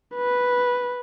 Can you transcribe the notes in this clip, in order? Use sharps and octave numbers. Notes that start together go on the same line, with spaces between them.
B4